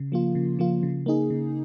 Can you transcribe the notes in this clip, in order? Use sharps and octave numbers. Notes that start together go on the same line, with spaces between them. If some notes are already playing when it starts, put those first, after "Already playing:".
Already playing: C#3
F3 A#3 F4
C#3
F3 A#3 F4
C#3
A#3 D#4 G#4
C#3